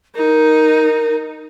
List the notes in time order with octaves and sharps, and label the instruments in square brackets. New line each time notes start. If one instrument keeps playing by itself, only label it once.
[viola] D#4 [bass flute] A#4